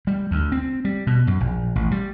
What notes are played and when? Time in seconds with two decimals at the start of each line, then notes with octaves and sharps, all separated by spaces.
0.07 G3
0.31 D2
0.52 C4
0.85 G3
1.07 B2
1.27 F#2
1.41 A#1
1.76 A1
1.91 G3